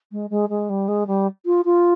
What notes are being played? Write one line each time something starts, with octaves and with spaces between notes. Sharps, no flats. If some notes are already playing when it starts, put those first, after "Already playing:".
G#3
G#3
G#3
G3
G#3
G3
F4
F4